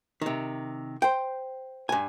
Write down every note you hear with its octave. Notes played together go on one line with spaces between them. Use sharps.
C3 D#3
C5 G5
G2 G#5